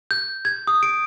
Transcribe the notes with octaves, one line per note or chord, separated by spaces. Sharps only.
G6
G#6
D#6
D7